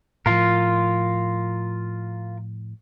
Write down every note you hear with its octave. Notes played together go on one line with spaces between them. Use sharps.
A2 F3 F4 A#4